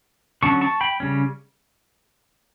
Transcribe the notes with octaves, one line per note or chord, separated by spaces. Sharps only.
D3 F#3 C#4 A5 C#6
A5 C#6
G5 B5
C#3 G3 C#4